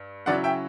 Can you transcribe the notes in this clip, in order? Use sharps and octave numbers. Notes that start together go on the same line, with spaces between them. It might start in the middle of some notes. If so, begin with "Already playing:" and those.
Already playing: G2
C#3 F#3 C#4 E4 D5 F#5
E5 G5